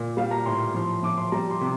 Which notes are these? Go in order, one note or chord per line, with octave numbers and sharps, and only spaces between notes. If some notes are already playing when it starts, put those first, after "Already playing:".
Already playing: A#2
G3 F5
A#5
A2 C6
F3 C6
F3 D6
C6
G3 A#5
C6
C3